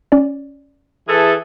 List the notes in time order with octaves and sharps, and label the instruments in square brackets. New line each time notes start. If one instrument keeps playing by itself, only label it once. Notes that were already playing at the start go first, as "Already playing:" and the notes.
[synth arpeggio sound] C#4 D5
[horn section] E3 G#4 A4